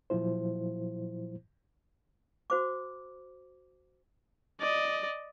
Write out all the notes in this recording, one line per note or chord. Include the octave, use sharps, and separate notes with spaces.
A#2 F3 F#3 E4 C5
F#4 C5 D6
D5 D#5